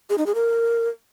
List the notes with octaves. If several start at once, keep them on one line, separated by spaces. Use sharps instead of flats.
G#4
D#4
G#4
A#4